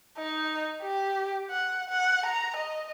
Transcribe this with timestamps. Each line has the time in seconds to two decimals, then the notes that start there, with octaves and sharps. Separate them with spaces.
0.18 D#4
0.83 G4
1.50 F#5
1.90 F#5
2.26 A#5
2.56 D#5